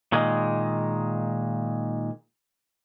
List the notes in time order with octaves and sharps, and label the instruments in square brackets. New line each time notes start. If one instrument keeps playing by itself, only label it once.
[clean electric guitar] A#2 D#3 G#3